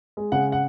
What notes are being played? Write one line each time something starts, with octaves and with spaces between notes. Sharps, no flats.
G#3
C#3 F#5
F#5